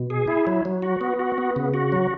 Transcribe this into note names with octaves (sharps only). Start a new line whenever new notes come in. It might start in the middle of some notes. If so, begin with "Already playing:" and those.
Already playing: B2
G#4
E4
F#3
F#3
F#4
B3
F#4
B3
C#3
F#4
F#3